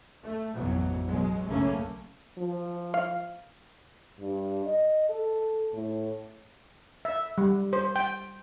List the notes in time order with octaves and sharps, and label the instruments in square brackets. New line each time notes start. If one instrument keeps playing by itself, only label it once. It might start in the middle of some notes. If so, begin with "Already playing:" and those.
[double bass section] A3
A1 F2 G#2 B2 E3 F#3
B2 F#3 G#3
B1 F#2 C#3 A3 A#3 C#4
[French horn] F3
[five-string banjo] F5
[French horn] G2
D#5
A4
A2
[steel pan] E5
G3
C5
G5